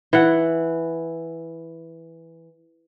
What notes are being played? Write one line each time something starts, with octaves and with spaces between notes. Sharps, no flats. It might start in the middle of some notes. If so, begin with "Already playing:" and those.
E3 F#5